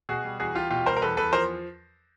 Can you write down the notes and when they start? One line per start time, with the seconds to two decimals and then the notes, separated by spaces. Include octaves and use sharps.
0.09 B2 F#4 G#4
0.24 G3
0.40 E2 F#4 G#4
0.55 E2 F4 G4
0.70 B2 F4 G4
0.86 G3 A#4 C5
0.97 A#4
1.02 E2 A4 B4
1.17 E2 A4 B4
1.33 F3 A#4 C5